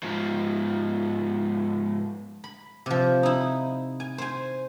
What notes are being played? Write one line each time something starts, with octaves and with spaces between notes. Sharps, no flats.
G#2 F3
B5
C3 F3
D#4 E4
G#5
C5 G#5